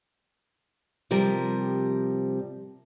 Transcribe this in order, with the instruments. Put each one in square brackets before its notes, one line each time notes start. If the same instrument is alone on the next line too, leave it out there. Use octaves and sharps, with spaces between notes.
[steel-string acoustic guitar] C3 F3 G3 A#4